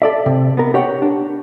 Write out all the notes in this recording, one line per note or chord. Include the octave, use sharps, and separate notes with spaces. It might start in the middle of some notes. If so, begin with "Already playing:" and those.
A4 D5 E5
C3
B3 A#4
G4 C#5 F#5
D4